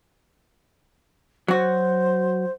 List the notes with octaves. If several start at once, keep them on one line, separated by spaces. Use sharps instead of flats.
F#3 F#4 C5